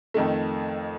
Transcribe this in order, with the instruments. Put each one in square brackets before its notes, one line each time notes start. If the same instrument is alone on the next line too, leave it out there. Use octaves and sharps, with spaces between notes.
[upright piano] F2 D#3 A3